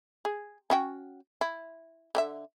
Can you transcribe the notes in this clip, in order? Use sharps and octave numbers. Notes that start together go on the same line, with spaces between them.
G#4
C#4 F#4 G5
E4
D3 G4 E5